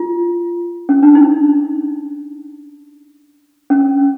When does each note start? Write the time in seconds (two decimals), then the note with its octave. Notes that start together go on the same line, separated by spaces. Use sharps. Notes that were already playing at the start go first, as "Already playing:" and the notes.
Already playing: F4
0.89 C#4
1.03 D4
1.15 D#4
3.70 C#4